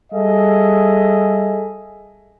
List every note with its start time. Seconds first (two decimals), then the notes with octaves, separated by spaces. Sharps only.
0.12 G3 G#4 A4 D#5 E5